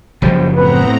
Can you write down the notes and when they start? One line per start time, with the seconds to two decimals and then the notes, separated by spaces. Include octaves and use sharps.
0.22 F#1 C#2 C3 F3 F#3 G5
0.56 A2 B3 C4 B4 A#5